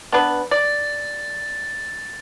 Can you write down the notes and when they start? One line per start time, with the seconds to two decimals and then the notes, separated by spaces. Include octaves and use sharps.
0.12 B3 D4 B4
0.51 D5 A6